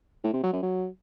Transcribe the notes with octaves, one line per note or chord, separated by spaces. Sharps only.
A2
C3
F#3
F#2
F#3